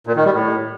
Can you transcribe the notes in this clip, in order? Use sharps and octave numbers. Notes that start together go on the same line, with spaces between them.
A#2
D#3
G3
A2